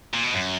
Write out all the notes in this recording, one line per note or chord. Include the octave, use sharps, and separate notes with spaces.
A#2
B2
F#2